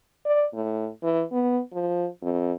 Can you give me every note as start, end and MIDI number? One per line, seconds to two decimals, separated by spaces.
0.25 0.46 74
0.54 0.88 45
1.03 1.24 52
1.32 1.60 59
1.73 2.08 53
2.22 2.52 41